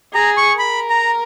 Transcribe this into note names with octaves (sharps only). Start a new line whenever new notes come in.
G#4 A#5
C#6
A#4 B5
A#5